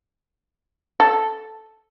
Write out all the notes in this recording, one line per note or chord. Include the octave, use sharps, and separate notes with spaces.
A4